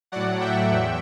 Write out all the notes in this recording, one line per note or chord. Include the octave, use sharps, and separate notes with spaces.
A2 F#3 D5 F#5
E5 G5
E2